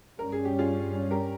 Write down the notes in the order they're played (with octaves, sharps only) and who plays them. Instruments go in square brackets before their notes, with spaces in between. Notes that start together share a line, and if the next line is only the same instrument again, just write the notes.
[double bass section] G2 G3 C#4 [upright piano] A#4
[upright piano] G#4
G4
F4 G#4
G4 A#4